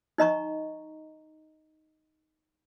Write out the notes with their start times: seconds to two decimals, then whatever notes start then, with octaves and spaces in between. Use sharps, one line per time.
0.18 D#4 D#5 A#5 C#6